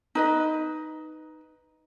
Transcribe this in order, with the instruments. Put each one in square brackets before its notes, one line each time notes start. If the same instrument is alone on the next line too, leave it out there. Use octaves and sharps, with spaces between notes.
[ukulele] D#4 B4 D#5